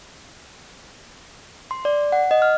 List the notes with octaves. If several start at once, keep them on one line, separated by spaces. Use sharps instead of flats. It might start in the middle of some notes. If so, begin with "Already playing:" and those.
C6
D5
F#5
D#5
F6